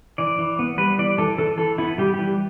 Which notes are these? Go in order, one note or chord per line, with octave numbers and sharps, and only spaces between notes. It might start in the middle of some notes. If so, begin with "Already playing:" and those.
E3 D5
E3
B3
G3 B4
E3 D5
E3 A4
E3 A4
E3 A4
B3 E4
G3 G4
E3 G4